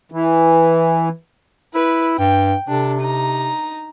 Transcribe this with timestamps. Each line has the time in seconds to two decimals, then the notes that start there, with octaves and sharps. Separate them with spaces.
0.12 E3
1.74 E4 B4
2.18 G2 G5
2.68 C3 D4 A4
3.01 D#4 A#5